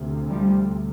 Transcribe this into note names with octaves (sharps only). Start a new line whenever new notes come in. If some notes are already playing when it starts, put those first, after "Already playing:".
Already playing: D2 C3
F3 G3